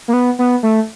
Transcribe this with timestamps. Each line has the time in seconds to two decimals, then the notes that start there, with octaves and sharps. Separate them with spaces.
0.08 A#3
0.13 B3
0.39 B3
0.63 A3